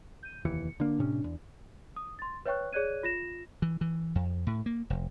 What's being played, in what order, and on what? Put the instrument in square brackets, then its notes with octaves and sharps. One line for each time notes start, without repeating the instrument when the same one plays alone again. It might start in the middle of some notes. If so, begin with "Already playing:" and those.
[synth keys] G6 D#7
[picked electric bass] F1 D#2 E3 [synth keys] C#7
[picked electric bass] D3 A#3 [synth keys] D4
[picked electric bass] A2 C3 C#4
E2
[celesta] D#6
C6 A6
B4 C#5 E5 G5 C#6 F#6
G#4 C#5 D5 F#6 G#6 D#7
F4 A#6 E7
[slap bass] E3
E3
F2
A2
A#3
F1